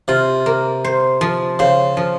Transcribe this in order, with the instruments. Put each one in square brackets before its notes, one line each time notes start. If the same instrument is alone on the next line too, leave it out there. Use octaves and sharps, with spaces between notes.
[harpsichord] C3 [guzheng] F4
[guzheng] A#3
C5
F3
[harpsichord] C#3 [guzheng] C5
[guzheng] F3